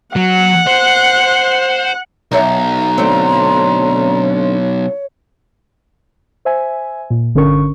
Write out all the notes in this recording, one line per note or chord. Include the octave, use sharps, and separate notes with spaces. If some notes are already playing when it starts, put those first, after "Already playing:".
F#3 F#5
C5
B1 D#4 C#5 E5 A#5
D3 A3 C4 C#5
C5 E5 G#5
A#2
G1 D3 C#4 A#4 C#6